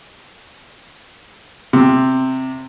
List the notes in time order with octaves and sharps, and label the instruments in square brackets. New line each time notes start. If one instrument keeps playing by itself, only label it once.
[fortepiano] C3